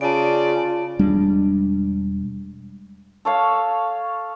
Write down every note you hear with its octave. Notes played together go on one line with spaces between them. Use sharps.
C#3 F4 D5 A5 D7
E1 G3 G#3 D4
A4 C#5 F5